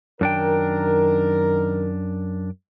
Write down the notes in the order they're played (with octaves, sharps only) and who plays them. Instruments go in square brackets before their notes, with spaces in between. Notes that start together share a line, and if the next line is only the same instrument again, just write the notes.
[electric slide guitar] F#2 D4 G5 [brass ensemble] D#3 A#4